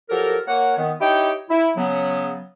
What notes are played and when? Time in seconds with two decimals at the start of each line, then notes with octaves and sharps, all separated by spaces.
0.10 F3 F#3 G4 A4 A#4
0.47 A#3 C#5 F#5
0.77 D#3 B3
1.00 D#4 E4 G4 C#5 G5
1.50 E4
1.77 C#3 F#3 B3